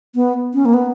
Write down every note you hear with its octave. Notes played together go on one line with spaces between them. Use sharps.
B3
C#4
A#3
B3